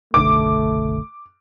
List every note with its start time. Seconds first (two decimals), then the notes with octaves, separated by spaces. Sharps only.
0.14 F#1 B1 D3 A3 D6